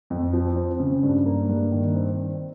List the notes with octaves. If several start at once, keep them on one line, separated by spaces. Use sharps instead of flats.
F2
F3
C4
C#3
G2
A#3
G2
D#3
C4